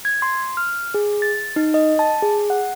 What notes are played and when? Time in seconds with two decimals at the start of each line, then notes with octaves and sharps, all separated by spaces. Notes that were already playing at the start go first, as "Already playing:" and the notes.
0.05 G#6
0.22 C6
0.57 F6
0.94 G#4
1.22 A6
1.56 D#4
1.74 D#5
1.99 A5
2.23 G#4
2.50 F#5